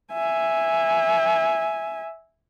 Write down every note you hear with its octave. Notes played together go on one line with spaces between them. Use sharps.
E5 G#5